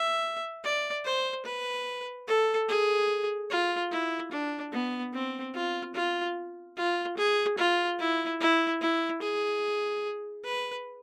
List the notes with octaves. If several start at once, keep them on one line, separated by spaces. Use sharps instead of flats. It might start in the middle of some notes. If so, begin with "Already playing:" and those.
Already playing: E5
D5
C5
B4
A4
G#4
F4
E4
D4
B3
C4
F4
F4
F4
G#4
F4
E4
E4
E4
G#4
B4